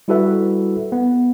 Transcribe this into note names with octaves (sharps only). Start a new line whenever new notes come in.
G3 E4 F#4 A4 B4 E5
B3